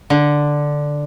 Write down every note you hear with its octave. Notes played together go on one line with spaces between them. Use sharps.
D3